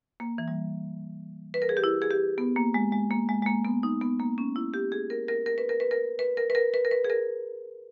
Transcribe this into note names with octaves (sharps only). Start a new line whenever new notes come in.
A#3
E3
G3
B4
A#4
G#4
G4
E4
G#4
G4
B3
A#3
G#3
G#3
A#3
G#3
G#3
A#3
B3
D#4
B3
A#3
C#4
E4
G4
G#4
A#4
A#4
A#4
B4
A#4
B4
A#4
B4
A#4
B4
A#4
B4
A#4
B4
G#4
A#4